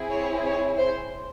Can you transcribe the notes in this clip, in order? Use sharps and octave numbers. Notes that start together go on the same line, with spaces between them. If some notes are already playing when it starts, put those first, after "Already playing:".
Already playing: C4 E4 G#4
C#5
C#5
C5